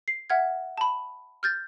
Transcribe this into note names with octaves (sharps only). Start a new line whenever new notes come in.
C7
E5 F#5 F6 G#6
A5 B5
F6 G6 A6